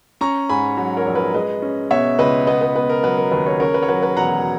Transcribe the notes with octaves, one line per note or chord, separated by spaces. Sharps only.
C#4 A#5 C#6
G#2 G#5 B5
F#3
A#4 C#5
A#1
B4
G#3 B4 D#5
C#4
B2 C#5 E5
C#2 B4 D#5
B3 B4 D#5
B4
B3 B4
A#4
F#3 B4
A#4
D#2 B4
A#4 C#5
C#3 A#4 C#5
B4
C#5
F#3 B4
B4
E1 F#5 A#5